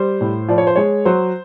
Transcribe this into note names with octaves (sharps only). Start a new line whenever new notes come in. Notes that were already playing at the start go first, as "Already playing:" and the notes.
Already playing: G3 C5
A2
F3 D5
C#5
C5
G#3 C#5
F#3 C5